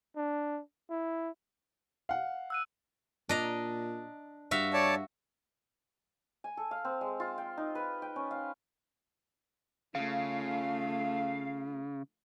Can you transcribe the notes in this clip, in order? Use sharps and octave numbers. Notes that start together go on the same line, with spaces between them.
D4
E4
F5 F#5
E6 F#6 D#7
A#2 D4 D#5 A#5
G2 F#4 E5 F5
C#5 D5 A5
G#5
A4
F5
C4
G#3
F4
G5
D#4
B4
G5
C#4
F5
C#3 A3 F4 F5